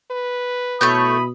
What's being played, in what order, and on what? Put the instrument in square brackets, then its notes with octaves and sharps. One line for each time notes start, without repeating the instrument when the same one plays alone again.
[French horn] B4
[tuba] B2 [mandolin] A3 C#5 G6 [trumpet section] E4 B5 D#6